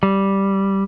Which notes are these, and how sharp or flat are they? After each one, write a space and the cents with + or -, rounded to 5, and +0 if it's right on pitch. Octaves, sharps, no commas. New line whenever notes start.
G3 -5